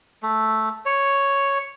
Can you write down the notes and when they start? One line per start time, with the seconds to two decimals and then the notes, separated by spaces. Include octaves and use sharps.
0.23 A3
0.86 C#5